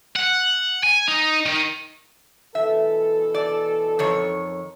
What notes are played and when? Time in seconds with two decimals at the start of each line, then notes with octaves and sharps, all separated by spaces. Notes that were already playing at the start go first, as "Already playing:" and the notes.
0.16 F#5
0.83 G#5
1.07 D#4
1.46 D#3
2.55 B2 E3 A4 E5
3.34 D5
3.99 F2 D#3 C#5